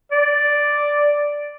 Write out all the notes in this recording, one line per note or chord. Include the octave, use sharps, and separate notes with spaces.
D5